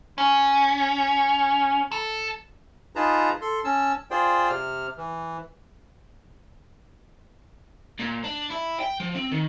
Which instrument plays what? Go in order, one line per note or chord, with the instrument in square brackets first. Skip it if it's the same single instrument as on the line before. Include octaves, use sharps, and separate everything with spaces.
[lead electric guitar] C#4
A4
[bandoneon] D#4 F4 G#4 B4 A5 A#5
A4 C6
C#4 A5 E6
F4 G#4 C5 D5 G5
C3 F6
E3
[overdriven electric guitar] A#2
D4
E4
G5
F3
C4
D#3